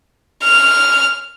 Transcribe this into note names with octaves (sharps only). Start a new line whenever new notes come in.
F6